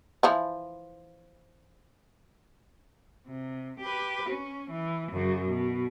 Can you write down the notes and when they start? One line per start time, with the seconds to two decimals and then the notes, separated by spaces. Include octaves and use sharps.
0.23 E3 F3 E4
3.28 C3
3.80 G4 B4
4.29 C#4
4.71 E3
5.12 F#2 C#3
5.49 B2